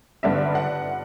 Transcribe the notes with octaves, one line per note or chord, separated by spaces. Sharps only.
G2 D3 G3 B3 E5
F#5